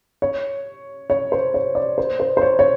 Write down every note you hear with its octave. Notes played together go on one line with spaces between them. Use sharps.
C#5
C#5
C5
C#5
D5
C5
C5
C5
C#5
C#5